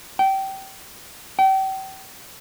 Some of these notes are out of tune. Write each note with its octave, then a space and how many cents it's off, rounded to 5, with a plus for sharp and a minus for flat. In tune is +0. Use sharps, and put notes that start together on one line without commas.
G5 -20
G5 -35